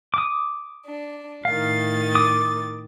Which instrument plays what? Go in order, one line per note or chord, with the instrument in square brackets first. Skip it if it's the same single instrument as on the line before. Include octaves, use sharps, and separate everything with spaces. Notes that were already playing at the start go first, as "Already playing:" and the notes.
[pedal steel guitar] D6 D#6
[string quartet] D4
[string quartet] A2 D#3 A6 [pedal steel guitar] F5
[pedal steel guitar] D6 D#6